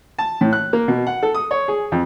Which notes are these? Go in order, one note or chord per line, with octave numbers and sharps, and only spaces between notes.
A5
A2
F#6
A#3
B2
F#5
A4
D#6
C#5
G#4
F2